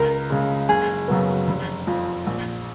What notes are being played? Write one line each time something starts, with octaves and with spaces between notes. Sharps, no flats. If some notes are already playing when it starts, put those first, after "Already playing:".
Already playing: C#2 A#4
C#3 G#3
F#1 G#4
F#2 C#3 F#3 B3
F1
F2 F3
A#1